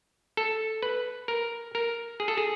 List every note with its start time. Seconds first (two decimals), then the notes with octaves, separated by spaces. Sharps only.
0.37 A4
0.83 B4
1.28 A#4
1.75 A#4
2.20 G#4
2.28 A4
2.38 G#4